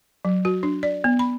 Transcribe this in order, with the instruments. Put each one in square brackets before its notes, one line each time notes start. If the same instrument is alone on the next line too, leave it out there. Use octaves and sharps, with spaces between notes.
[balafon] F#3
F#4
D4
D5
B3
B5